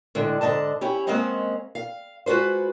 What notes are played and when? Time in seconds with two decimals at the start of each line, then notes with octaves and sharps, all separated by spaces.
0.15 A2 D3 G#3
0.41 G#2 D3 F#3 D#5 A5
0.81 C#4 E4 G4 C#5
1.07 G#3 A#3 C4 C#4 D#5 F#5
1.75 F5
2.26 G#3 F4 F#4 B4 C5